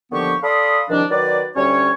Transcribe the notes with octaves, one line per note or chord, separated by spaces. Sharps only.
D#2 D3 F3 B3 G4 C#6
A4 D5 F5 B5 C6 D#6
C2 D#3 F3 D4
D#3 F#3 B4 D5
D2 G3 C#4 C#5